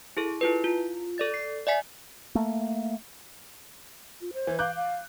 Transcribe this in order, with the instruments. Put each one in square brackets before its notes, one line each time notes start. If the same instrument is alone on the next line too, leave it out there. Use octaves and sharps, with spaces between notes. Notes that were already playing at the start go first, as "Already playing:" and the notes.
[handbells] E4 G#4 A4
E4 F4 B4
F4
A4 D5 A6
C7
D5 E5 G#5 B6
[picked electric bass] A3 A#3
[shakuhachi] F4
C5
[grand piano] E3
[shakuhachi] F5 [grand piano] D6 F#6 G6
[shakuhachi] F5